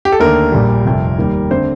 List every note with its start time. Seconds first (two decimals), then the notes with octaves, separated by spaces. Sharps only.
0.05 G4
0.12 A4
0.19 D#2 D3 A3 A#4
0.52 A#1 A#2 G3
0.85 F1 F2 C3 G3
1.18 D#2 D#3 G3
1.50 D3 A3 C4 C5